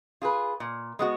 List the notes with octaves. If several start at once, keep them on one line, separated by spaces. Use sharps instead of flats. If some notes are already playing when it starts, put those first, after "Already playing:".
F4 G#4 B4
A#2
G#3 B3 F#4